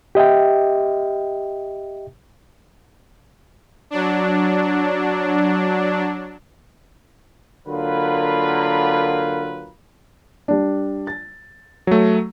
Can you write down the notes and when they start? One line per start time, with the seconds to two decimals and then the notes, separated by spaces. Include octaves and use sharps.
0.15 G4 D#5 E5 G5
3.90 F#3 D4
7.68 D3 F#3 A#3 F4 A#4 B4
10.48 G3 D4
11.07 A6
11.87 F#3 A3